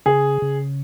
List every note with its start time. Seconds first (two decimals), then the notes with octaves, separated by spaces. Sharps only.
0.06 C#3 G#4
0.42 C#3